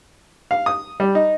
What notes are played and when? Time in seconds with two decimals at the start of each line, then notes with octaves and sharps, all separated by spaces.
0.51 F5
0.66 D#6
1.00 G3
1.15 D#4